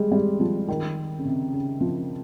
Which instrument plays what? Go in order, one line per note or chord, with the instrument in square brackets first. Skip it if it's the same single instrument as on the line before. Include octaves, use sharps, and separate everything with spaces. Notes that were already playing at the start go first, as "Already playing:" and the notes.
Already playing: [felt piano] G3 G#3
G3
F3
D#3
C#3
C3
C#3
F3